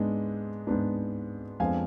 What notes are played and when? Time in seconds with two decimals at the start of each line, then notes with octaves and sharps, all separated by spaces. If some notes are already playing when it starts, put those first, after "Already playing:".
Already playing: G#2 G#3 B3 D4
0.67 G#2 G#3 B3 D4
1.60 F2 F3 G#3 B3 D4 F5 G#5